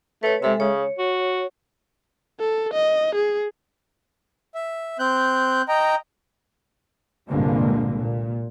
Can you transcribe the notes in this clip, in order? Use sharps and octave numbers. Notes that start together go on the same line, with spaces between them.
A3 B4 C#5
C3 G#3 A4 E5
C#3 C#5
F#4
A4
D#5
G#4
E5
C4 F#6 G6
D#5 G5 A#5
C2 G2 A#2 D3 G#3 A#3
A#2